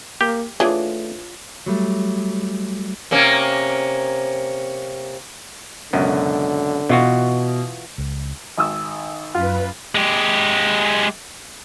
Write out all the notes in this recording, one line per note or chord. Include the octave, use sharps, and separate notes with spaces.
A#3 G4
E3 A3 D4 F4 G#4 C#5
F#3 G3 A3
C3 A#3 C#4
C#2 F#2 B2 D3
B2 E3 F4 F#4
C#2
G#1 D#6 E6
F#2 F4 B4
G#3 G4